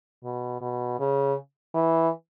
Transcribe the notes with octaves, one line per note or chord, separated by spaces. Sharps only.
B2
B2
C#3
E3